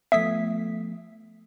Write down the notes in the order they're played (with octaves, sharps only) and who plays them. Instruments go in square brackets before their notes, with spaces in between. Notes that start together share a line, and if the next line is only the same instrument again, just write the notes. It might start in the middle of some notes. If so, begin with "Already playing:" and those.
[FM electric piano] F3 A3 B3 [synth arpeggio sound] E5 D#6 B6